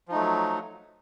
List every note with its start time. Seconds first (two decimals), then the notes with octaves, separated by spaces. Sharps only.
0.08 F3
0.11 D#4
0.15 A3
0.18 F#3